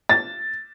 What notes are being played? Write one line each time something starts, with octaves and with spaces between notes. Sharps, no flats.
A6